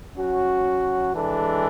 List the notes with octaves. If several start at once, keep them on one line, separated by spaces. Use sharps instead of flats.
F#3 C#4 F#4
E3 G#3 D4 A4